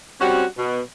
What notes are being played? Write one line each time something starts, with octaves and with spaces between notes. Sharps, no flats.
G3 C4 C#4 F#4
B2